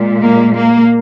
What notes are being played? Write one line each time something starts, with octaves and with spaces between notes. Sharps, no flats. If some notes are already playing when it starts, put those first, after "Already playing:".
Already playing: A#2 G#3
A#3
A#3